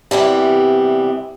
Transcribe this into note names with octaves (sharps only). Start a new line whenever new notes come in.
C3 E3 G3 B3